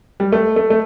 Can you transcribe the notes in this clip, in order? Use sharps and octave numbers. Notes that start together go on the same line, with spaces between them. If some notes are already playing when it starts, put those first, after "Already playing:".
G3
A3
A3
A3